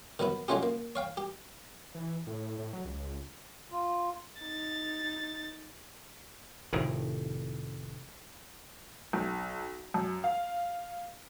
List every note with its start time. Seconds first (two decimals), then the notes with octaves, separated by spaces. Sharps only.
0.19 D#3 F#3 B3 E4
0.48 F#3 G#3 A3 C#4 F4 G4
0.63 A#3
0.95 C#5 F5 G5
1.17 G4
1.94 E3
2.27 A2
2.59 A2
2.73 F#3
2.85 C#2
3.72 F4
4.40 D#4 A6
6.73 F1 A2 D#3
9.13 B1
9.94 F#2
10.24 F5